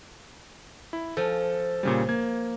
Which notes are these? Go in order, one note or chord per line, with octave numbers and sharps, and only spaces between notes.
E4
F3 A4 G#5
A#2 C#3 G3
A#3 G#6